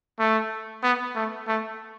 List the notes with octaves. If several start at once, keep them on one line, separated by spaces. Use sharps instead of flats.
A3
B3
A3
A3